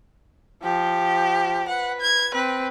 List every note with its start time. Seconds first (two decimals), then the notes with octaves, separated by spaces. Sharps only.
0.63 F3 G4
1.68 B4 F#5
2.01 G#6
2.34 C4 B4